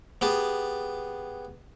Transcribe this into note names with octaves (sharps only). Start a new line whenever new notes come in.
B3 G4 G#4 A5